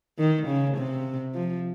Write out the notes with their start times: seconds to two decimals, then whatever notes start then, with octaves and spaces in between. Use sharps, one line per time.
0.18 D#3
0.47 C#3
0.77 C3
1.34 F3